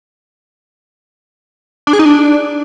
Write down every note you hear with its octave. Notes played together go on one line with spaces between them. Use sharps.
D4
G#4
D#4
D4